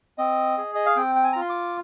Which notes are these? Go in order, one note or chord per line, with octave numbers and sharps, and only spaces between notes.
C4 D#5
G#4
D#5
F5
C4 G5
G5
G#5
A#5
F4 C6
D6